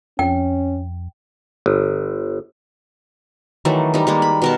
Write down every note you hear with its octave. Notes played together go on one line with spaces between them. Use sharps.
F2 C#4 G5
G1
D#3 E3 F#3 A3
G3 D#4
G3 G#3 A#3
B5
B2 A#4 A5